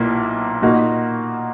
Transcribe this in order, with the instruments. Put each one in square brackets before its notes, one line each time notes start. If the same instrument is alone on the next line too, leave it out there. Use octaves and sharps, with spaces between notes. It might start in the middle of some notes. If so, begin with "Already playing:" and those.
Already playing: [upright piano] B1 A#2 A#3 E4
A#2 A#3 D#4 F#4